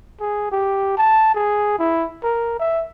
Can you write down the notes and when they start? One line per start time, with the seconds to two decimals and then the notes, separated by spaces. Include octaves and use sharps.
0.20 G#4
0.51 G4
0.97 A5
1.35 G#4
1.79 E4
2.23 A#4
2.59 E5